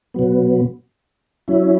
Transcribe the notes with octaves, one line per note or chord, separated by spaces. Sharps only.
B2 F#3 B3
F#3 C#4 E4